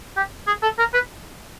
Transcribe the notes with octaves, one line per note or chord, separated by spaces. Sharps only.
G4
G#4
A4
A#4
B4